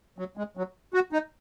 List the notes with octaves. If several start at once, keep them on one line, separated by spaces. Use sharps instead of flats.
F#3
G#3
F#3
F#4
D#4